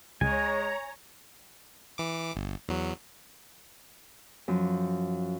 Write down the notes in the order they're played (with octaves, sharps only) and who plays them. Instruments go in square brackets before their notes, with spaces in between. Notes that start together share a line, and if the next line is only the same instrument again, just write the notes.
[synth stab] C#2 [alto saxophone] G#3 [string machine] C#5 A#5 [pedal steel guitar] G#5
[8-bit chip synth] E3 D6
G1
E2 F#3
[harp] F#2 F3